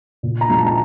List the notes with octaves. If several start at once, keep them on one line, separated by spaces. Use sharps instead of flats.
A#2
A#5
F3 G#3
A5
A#5